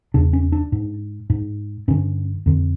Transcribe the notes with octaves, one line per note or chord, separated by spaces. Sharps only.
E2 C#3 D4
C#4
D4
G#2
G#2
G2 D3 C#4
F2 D3